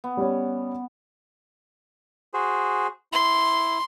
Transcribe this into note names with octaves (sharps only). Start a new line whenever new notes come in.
B3
G3 C#4
F#4 G#4 C5
E4 C6